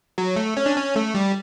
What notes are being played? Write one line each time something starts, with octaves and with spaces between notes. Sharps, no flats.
F#3
A3
C#4
D4
C#4
A3
G3